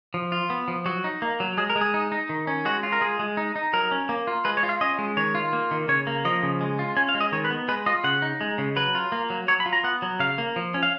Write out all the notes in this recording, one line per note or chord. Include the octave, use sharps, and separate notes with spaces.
F3
F4
B3
F3
F#3 F#4
D#4
A#3
F#3
G#3 G#4
A#4
G#3
G#4
D#4
D#4
D#3
C#4
G#3 F#4
F4
A#4
G#3 G#4
G#3
D#4
D#4
F#3 A#4
C#4
A#3
F4
G#3 B4
C#5
F4
F5
C#4 D#5
G#3
D#3 C#5
F4
A#3
D#3
C#3 C#5
A#3
F3 D#5
C#3
G#3
F4
C#4 G#5
F5
G#3
D#5
D#3 C#5
B4
B3
G#3 B4
F4 D#5
C#3 F#5
D#4
G#3
C#3
F#3 B4
F4
A#3
F#3
F#3 C#5
B5
F4
A#5
B3 F#5
F#3
C#3 F5
A#3
F3
C#4
F5